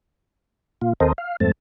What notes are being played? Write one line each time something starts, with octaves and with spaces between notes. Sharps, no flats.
A#2 F4
D#2 C4 A4 A#4 C5 D#5
F5
F2 G#2 A3 C4 A5